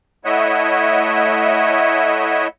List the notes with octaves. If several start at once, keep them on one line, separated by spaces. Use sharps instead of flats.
A3 E4 C#5 D#5 E5 F#5